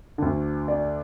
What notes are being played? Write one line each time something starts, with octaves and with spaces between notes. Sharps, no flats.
D2 D3
D5